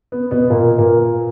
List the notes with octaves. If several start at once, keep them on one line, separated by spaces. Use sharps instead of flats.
B3
B2 B3
A#2 A#3
A#2 A#3